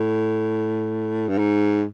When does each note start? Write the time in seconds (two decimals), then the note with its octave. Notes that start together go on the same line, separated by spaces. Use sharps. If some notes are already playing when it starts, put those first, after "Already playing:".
Already playing: A2
1.28 G2
1.38 G#2